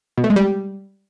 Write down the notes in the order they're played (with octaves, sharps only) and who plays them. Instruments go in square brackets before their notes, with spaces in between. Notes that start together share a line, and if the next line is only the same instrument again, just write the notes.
[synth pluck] B2
A3
G#3
G3